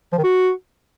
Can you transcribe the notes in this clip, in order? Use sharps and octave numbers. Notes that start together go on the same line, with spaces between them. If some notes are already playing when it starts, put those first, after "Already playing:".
F3
D#3
F#4